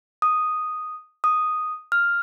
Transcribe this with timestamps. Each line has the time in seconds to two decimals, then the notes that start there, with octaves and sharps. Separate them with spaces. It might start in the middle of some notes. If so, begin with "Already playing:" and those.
0.22 D#6
1.24 D#6
1.92 F6